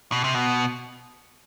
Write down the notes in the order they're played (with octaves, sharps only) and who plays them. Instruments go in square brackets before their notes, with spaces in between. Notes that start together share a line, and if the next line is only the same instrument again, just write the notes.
[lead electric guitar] B2
C3
B2